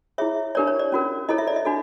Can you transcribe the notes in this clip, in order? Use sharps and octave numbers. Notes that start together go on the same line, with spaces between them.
E4 G#4 C#5 E5
D4 G4 A#4 C#5 D5
C#5
D5
C#4 F#4 A#4
E4 A4 C#5 D#5
E5
D5
D#5
D4 F#4 A4